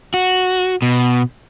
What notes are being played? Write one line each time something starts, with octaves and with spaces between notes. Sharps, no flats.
F#4
B2